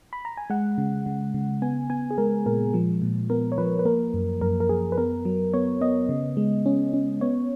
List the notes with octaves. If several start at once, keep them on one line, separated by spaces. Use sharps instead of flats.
B5
A#5
G#5
G#3 F#5
C#3
C#3
C#3
B3 G#5
B3 G#5
G#4
G#3 A#4
A#2 A#4
F3
A#2
B3 A#4
C#5
F3 B4
B4
A#3 A#4
F#2
F#2 A#4
A#4
F#2 G#4
B4
B3 A#4
F#3
B3 C#5
B3 D#5
C#3
G#3
C#4
C#4
B3 C#5